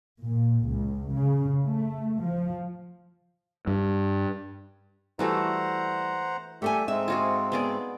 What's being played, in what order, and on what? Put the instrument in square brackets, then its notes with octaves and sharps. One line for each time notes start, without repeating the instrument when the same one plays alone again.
[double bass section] A#2
C#2
C#3
A3
F3
[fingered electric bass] G2
[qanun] E3 A3 F#4 [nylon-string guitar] G3 [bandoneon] C5 F#5 A#5
[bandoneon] G3 G4 E5 [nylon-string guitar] A3 A4 G#5
[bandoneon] G#2 G#3 C4 [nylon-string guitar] E5
[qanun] F4 F#4 G#4
B3 G#4 D5